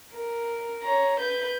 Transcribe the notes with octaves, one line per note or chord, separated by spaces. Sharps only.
A#4
C#5 A#5
B4 G6